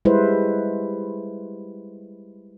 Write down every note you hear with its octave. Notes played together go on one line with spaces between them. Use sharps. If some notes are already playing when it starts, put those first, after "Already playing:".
G3 G#3 E4 B4 C5